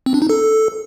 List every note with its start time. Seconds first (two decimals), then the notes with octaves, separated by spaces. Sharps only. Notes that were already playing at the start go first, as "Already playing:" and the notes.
0.06 C4
0.14 D4
0.22 D#4
0.29 A4